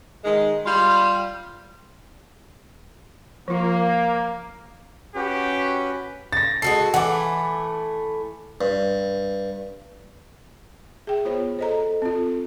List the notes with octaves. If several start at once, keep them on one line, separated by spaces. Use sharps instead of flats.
D#3 G#3
G3 F4
F3 A#3 F4
C#4 F#4 G4 B4
A6 A#6
G#3 F#4 A4 C7
E3 A3 F#5 D6
G2
G#4 E5 G5
B3 F4 C5 C#5
A4 C5 D#5 A#5
C4 F4